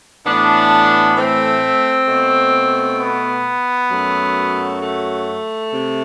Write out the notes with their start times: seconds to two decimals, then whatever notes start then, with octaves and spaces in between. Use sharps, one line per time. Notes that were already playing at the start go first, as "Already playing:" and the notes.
0.24 A2 E3 A3 B3 D4
1.16 A3 C4
2.07 B2 A3
2.99 B3
3.90 F#2 F#3 A3
4.81 A3
5.72 C3